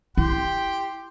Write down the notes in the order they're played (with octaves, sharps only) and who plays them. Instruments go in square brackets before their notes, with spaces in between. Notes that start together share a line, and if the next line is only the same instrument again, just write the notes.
[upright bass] E4 [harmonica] G4 G5 C6